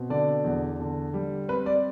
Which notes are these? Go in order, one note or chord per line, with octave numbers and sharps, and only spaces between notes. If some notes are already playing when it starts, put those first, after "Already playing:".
Already playing: B2 C4
D3 D5
E2
D3
G3
C4 B4
D5